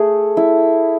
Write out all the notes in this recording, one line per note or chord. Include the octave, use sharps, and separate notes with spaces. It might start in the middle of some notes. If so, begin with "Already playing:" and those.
Already playing: A3 G#4
E4